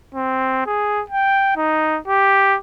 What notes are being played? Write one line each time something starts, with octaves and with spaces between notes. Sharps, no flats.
C4
G#4
G5
D#4
G4